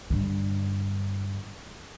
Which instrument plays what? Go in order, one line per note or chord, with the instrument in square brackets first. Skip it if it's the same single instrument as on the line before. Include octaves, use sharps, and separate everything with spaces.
[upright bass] G2 D3